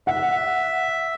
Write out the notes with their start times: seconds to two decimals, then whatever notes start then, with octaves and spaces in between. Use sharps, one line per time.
0.07 E5 F#5